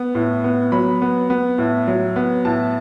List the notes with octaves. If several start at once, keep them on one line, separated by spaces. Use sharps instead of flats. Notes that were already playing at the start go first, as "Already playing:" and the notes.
Already playing: B3
A2
B3
F#3 B5
B3
B3
A2
F#3
B3
A2 A5